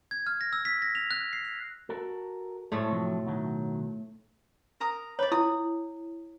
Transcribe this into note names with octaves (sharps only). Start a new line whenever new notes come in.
G#6
F6
A#6
E6
B6
A#6
F7
F#6
C7
F7
F#4 A4 A#4
A2 G#3 A3 C5 C#5
C3 F3 F#3
B2 D#3 F#3
A#4 A#5 D#6
B4 C#5 D5
E4 D#6